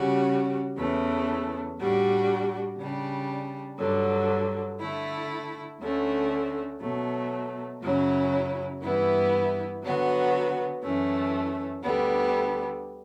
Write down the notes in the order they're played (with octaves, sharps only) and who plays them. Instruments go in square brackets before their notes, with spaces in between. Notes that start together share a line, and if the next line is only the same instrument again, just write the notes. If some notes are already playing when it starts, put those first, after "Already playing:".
Already playing: [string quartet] C#3 G3 C#4 F#4
E2 C#3 E3 A3
A2 G3 D4 F#4
C#3 G3 D4
G2 D3 F#3
D3 A3 E4
D2 D3 A3 C#4
B2 F#3 A3
F#2 C#3 F#3 C#4 E4
G2 E3 B3 E4
D3 F#3 B3 F#4
F#2 E3 A3 C#4
D2 D3 G3 B3